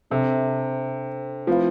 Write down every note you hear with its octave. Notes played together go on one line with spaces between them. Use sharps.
C3 D4 A4 C5 E5 A5
F3 A3 C4 E4 B4 F5